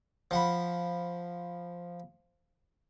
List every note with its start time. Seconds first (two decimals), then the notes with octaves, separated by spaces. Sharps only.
0.31 F3 F#5 B5